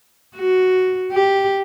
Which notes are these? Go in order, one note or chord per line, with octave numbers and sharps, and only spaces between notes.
F#4
G4